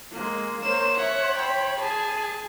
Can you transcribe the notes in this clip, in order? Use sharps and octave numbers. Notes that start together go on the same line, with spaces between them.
G#3 A#3
A#3 C5 C#5 E7
C#5 E5 F#5
G5 B5
G#4 G#5 A5